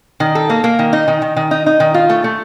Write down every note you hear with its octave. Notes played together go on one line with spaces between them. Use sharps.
D#3
A4
A#3
A#3
D#3
D#4
D#3
D#3
D#3
D#4
D#4
D#3
F4
A3
A3